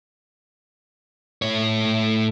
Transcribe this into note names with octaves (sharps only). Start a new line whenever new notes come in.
A2 C#5